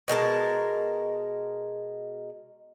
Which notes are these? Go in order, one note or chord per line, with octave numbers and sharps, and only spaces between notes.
B2 G#3 A#4 A5